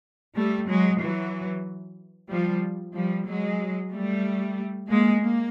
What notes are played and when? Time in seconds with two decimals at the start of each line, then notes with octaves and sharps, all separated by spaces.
0.36 G3 A3
0.68 F#3 G#3
1.00 E3 F#3
2.30 F3 G3
2.95 F3 G3
3.27 F#3 G#3
3.92 G3 A3
4.89 G#3 A#3
5.21 A#3